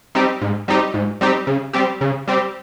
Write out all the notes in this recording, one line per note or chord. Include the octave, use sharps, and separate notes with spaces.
G3 C4 D#4 G4
G#2
G3 C4 D#4 G4
G#2
G3 C4 D#4 G4
C#3
G3 C4 G4
C#3
G3 C4 G4